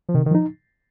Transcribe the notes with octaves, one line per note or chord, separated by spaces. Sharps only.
F3
C3 D#3
D#3
F3 D#4